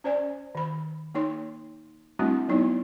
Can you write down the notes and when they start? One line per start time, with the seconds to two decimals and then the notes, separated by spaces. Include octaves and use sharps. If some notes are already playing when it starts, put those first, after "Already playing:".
0.04 C#4 C5 D5 G#5
0.55 D#3 B5
1.15 A#3 D#4 C#5 C6
2.19 G3 A3 C4 D4 E4 F#4
2.48 F#3 B3 D#4 E4 C#5